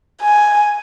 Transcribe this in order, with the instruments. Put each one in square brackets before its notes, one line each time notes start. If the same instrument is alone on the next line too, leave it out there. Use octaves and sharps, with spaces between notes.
[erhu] G#5